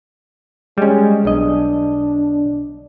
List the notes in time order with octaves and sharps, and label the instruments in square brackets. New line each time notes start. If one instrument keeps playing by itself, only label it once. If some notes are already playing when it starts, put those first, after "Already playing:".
[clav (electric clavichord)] G3 C#4 [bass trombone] G#3
[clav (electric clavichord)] B1 D#5 [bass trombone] D4